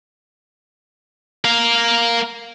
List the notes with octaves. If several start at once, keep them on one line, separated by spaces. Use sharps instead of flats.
A#4 F5